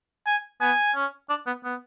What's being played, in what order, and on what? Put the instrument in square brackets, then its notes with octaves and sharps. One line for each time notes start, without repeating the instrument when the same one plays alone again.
[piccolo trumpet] G#5
[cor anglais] B3 [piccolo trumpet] G#5
[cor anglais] C#4
D4
B3
B3